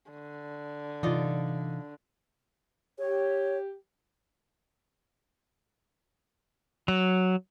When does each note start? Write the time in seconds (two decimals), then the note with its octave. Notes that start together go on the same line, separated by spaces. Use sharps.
0.11 D3
1.03 C3 E3 D#4 F4 D5
2.99 G4 C#5
6.88 F#3